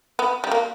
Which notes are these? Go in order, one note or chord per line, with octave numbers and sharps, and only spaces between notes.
B3
G3
A#3